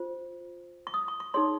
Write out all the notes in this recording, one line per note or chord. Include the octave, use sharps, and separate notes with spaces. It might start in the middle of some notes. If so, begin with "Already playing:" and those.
Already playing: F4 C5
C#6
D#6
C#6
C#6
D#4 G#4 C#5 C6